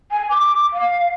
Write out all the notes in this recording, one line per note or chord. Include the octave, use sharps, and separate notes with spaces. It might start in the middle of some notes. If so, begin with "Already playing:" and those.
G#5
D6
F5